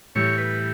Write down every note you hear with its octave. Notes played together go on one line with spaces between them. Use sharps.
A2 E3 G3 C#5
B4